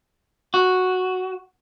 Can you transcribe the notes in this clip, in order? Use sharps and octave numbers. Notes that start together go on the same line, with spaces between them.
F#4